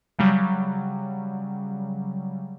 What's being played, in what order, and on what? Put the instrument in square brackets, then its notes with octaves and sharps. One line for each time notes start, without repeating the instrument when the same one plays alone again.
[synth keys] C#3 F#3 G3